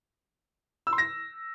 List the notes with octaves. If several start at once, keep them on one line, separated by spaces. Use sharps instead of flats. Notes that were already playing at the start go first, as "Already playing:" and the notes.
E6
C6
A#6